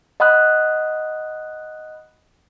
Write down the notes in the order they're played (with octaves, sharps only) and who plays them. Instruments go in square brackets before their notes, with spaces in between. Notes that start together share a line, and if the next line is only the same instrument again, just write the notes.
[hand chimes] D#5 F#5 B5 D#6 F#6